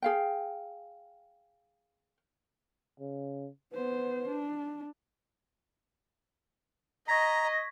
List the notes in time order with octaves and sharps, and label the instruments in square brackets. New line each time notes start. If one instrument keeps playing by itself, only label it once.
[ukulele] G#4 F5 G5
[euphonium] C#3
[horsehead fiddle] B3 C5 [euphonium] B4
[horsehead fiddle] D4
[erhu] D#5 [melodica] A#5 [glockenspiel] C#6 G#6 B6 [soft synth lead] A#6